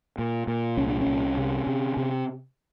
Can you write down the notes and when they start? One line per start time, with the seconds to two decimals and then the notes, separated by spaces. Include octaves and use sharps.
0.18 A#2
0.47 A#2
0.77 C2 C#4
0.88 D4
1.01 C#4
1.07 C2
1.37 C3
1.67 C3
1.97 C3